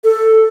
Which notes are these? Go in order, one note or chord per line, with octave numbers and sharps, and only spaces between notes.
A4